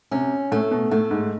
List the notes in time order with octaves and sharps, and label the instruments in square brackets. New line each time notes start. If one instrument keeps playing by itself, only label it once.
[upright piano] C3 [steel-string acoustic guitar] C#4
[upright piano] A2 [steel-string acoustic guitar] A3
[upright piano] B2
[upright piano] A2 [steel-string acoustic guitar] A3
[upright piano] G#2